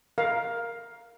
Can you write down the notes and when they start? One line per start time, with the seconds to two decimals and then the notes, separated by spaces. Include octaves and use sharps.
0.18 A#4 F5